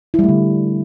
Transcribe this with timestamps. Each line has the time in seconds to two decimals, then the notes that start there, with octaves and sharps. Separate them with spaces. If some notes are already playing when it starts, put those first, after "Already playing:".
0.14 E4
0.19 G3
0.24 A3
0.29 D3